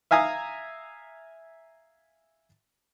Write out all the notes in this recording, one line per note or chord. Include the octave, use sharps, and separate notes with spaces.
E5 F5 G#5 A#5 D#6